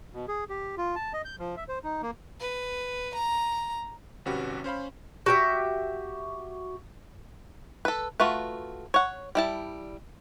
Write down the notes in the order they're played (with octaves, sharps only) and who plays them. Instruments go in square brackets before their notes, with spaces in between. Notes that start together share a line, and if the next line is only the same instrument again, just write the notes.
[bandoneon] B2
G#4
G4
F4
A5
D#5
G6
F3
E5
C5
D#4
A#3
[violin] B4
A#5
[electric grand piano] G#1 C3 C#4 F#4 G4 B4
C#4 C5 F5 B5
[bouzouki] F#4 G4 E5
[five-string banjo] A4 B4
A3 F4 F#4 B4
C#5 F#5
G3 E4 A5